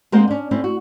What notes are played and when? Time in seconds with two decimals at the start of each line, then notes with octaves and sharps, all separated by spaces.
0.12 G#3 A#3 C4 C5 D#5 F#5
0.28 C#4 D4
0.51 A3 C4 C#4 E4
0.64 F#4